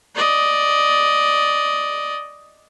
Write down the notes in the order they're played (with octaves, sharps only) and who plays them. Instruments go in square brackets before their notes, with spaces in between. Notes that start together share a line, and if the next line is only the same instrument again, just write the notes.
[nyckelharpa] D5 D#5